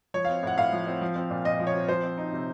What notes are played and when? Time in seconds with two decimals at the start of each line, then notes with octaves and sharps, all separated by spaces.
0.14 F3 C#5
0.25 C4 F5
0.43 A2 F#5
0.58 A2 F5
0.72 F3
0.87 C4
1.01 F3
1.16 C4
1.30 A#2
1.45 A#2 D#5
1.60 F3
1.67 C#5
1.74 C4
1.89 F3 C5
2.03 C4
2.18 D#4
2.33 C3